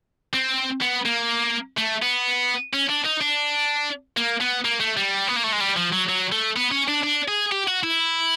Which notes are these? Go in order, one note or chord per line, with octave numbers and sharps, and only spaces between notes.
C4
B3
A#3
A3
B3
C#4
D4
D#4
D4
A#3
B3
A#3
A3
G3
B3
A#3
A3
G#3
G3
F3
F#3
F#3
A3
B3
C#4
D4
D4
G#4
G4
F#4
E4